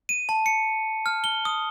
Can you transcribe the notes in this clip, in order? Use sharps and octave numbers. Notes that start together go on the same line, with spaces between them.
D#7
A5
C#7
F6
G7
D#6